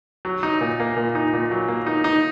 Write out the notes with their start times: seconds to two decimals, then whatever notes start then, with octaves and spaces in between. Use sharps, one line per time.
0.25 F#3
0.43 D#4
0.61 A#2
0.80 A#3
0.97 A#2
1.15 D#4
1.34 A#2
1.51 F#3
1.68 A#3
1.86 D#4
2.04 D#4